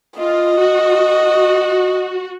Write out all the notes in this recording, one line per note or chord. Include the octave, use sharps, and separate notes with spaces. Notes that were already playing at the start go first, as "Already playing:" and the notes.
F4 D#5
F#4